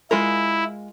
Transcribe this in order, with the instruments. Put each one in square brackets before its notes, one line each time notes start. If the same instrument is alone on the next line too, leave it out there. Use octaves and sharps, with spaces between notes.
[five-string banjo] G#3 F4 A#4 [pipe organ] E4